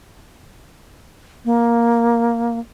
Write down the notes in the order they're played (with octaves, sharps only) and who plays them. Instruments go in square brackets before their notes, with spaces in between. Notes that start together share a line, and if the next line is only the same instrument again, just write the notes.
[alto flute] A#3